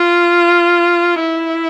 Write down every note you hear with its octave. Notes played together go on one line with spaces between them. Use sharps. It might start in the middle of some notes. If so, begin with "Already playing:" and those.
Already playing: F4
E4